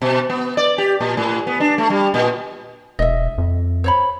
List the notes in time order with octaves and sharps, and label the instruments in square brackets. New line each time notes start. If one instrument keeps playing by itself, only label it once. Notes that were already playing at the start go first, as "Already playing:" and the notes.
[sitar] B2
B3
D5
G4
A#2
A2
B3
D4
A3
G3
A#2
[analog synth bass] E1 [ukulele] D#5 E5
[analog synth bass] F2
[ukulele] C5 C#5 B5